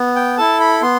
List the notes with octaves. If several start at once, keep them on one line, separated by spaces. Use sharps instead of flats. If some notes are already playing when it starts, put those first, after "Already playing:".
Already playing: B3
G5
E4 A4 A5
B5
B3 C6